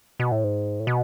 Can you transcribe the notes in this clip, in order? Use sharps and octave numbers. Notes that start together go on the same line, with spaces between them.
B2
A2
G#2
A2
B2